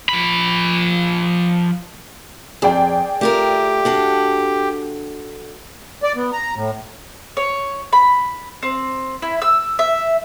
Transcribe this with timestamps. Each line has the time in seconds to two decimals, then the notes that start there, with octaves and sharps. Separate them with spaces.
0.09 F3 B5
2.62 F2 G#4 D5 G5
3.21 A3 F4 G4 A#4
3.85 D4 F#4 A4
6.03 D5
6.16 B3
6.32 A#5
6.56 A2
7.37 C#5
7.93 B5
8.63 C4
9.22 E4
9.42 E6
9.79 E5